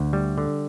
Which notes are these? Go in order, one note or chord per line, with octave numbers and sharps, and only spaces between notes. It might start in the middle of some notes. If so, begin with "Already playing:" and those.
Already playing: D2
G3
D3